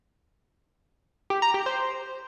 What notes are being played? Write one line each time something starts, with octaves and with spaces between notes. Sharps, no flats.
G4
A#5
G4
C5